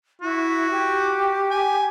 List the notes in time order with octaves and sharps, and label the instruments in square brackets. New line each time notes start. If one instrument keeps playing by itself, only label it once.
[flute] E4 [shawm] F#4
[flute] G4
[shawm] G#5